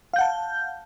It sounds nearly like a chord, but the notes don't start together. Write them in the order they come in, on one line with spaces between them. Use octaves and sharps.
F5 G6 F#5 A5